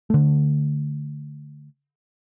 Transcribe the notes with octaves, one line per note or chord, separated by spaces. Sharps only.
D3 A3